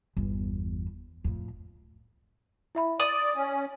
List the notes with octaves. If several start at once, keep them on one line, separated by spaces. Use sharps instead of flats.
G1 E2
F2 A2
E4 E5 B5
D5 D#6 F#7
C#4